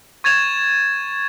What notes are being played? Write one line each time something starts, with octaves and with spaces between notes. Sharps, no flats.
C#6 G#6 A6 E7 F7